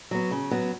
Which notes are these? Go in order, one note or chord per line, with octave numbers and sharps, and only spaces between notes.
F#3 B3
C#3
F#3 B3